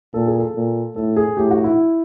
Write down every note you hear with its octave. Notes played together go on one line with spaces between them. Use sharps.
A#2 A4
G#4
A4
A#2
A2 A4
G#4
A2 G4
F#4
E4